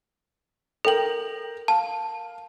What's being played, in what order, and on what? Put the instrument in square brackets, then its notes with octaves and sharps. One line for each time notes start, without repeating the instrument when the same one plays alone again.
[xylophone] A4 F#7 [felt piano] A#4 G5
[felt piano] F5 [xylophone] A5